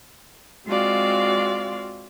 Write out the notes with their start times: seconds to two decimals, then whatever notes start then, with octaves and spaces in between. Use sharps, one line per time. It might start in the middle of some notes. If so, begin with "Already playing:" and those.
0.67 G#3 C4 F4 F#4 D5 F5